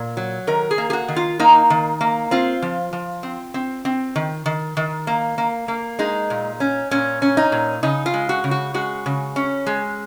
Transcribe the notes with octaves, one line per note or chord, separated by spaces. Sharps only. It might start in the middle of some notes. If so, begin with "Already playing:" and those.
Already playing: A#2
F#3
D#3 A#4
G#4
A#3
G#4
F#4
D#3
F4
A#3 D#4
D#3
A#3
C4 F4
F3
F3
C4
C4
C4
D#3
D#3
D#3
A#3
A#3
A#3
G#3 D#4
A#2
C#4
A#2 C#4
C#4
D#4
A#2
C#3 D#4
F4
G#3
F#4
C#3
F#4
G#3 F#4
C#3
C#4
G#3